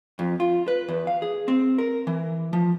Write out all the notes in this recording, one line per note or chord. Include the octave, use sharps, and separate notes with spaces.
F2
F4
B4
E2
F5
G#4
C4
A#4
E3
F3